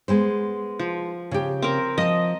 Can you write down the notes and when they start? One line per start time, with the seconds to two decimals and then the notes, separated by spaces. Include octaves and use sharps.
0.08 G#3 B3 C5
0.79 F3
1.31 C#3 G4
1.62 C4 A#4
1.98 F3 D#5 A5